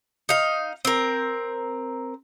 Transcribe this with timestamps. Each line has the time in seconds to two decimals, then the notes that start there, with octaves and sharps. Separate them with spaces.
0.29 D#4 F5
0.85 C4 A#4